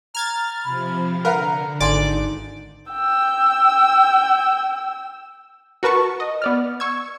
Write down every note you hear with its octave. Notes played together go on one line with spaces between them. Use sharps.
A#5 F6 G#6 A6
C3 F3 B5
D3 A#4 B4 F5 F#5 A#5
G#1 D4 D#4 D5 G#5 C6 D6
G5 E6
F#4 A#4 B4 A5 C#6
D#5
B3 D5 F6
C#6 E6 G#6